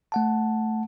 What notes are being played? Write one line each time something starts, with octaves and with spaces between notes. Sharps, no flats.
A3 F#5 A5